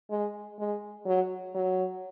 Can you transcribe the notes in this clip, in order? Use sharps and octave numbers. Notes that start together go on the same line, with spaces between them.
G#3
G#3
F#3
F#3